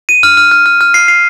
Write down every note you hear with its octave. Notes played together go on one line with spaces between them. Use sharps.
D#7
F6
F6
F6
F6
F6
C7
C7